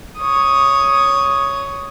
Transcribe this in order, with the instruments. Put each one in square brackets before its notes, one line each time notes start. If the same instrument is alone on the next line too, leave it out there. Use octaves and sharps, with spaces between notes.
[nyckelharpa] C#5 D#6